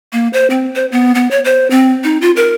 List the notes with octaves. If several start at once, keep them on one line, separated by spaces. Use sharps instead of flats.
A#3
C5
C4
C5
B3
B3
C#5
C5
C4
D#4
F4
A#4